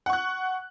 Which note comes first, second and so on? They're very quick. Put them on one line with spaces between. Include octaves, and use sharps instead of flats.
F#5 C#6 F#6